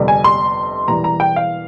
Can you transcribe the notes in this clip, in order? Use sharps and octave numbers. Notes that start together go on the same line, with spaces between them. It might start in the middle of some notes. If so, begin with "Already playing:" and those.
Already playing: G1 F2 C3 G3
G#5
C6
E1 E2 E3 G3 A#5
A#5
G5
F5